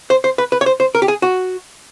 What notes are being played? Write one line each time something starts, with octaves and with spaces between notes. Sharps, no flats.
C5
C5
B4
B4
C#5
C5
C5
A#4
G4
G#4
F#4